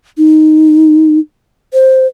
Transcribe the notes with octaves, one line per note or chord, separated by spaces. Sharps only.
D#4
C5